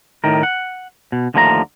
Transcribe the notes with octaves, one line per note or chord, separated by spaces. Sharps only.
A2 D#3 A#4
F#5
B2
D#2 D3 F3 A3 G5 A#5